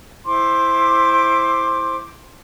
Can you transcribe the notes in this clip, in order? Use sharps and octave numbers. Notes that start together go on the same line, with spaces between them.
E4 C5 C6 D6